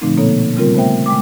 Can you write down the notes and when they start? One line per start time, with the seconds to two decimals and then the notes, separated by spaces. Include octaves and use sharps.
0.01 A#2 D3 F3 A3 C4 D#4
0.17 B2 A#3 B3 A4 C#5
0.57 C#3 G3 C4 F4 A#4
0.74 A3 B3 C5 E5 G5
1.06 G#3 G5 D6